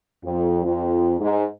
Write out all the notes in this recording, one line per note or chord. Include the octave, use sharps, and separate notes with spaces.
F2
F2
G#2